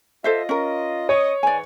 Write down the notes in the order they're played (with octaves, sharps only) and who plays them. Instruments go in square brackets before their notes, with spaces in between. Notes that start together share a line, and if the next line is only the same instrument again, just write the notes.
[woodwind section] F4 D#5 [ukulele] A4 C5 E5
[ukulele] C#4 A#4
[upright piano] C#5 [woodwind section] D#5 C#6 D#6
[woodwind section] G#2 E3 [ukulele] D5 G#5